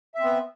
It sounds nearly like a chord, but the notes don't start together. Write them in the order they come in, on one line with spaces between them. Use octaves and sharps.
E5 C4 B3